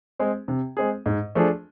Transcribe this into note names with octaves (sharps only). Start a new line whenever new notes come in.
G#3 C4 G#4
C3
G#3 C4 G#4
G#2
F3 A3 D4 G#4